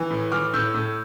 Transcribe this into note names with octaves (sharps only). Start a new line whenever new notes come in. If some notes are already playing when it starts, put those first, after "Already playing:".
Already playing: E3
A2
E3 D6 F6
A2 E6 G6
A2